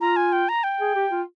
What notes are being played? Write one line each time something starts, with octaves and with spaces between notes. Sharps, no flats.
F4 A#5
G#5
G5
A#5
G5
G#4
G4
F4